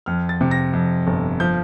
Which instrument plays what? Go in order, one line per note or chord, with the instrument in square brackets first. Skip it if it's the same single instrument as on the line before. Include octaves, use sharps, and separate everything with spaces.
[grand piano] F2 F6
A6
C3
A#6
F2
G1
F3 G6